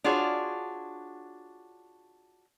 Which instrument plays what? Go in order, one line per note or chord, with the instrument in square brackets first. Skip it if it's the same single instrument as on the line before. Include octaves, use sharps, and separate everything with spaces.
[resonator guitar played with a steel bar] D4 F4 F#4 G#4 C#5